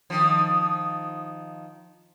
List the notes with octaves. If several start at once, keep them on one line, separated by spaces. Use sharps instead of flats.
D#3 F3